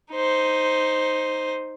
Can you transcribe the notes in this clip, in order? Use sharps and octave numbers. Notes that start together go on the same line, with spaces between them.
D#4 C5